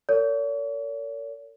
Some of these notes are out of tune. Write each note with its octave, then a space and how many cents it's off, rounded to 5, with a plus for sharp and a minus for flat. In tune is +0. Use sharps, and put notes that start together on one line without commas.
A#4 -40 C#5 +45